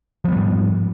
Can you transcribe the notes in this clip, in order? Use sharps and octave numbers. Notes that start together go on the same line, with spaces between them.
G#2 F3 G3 B3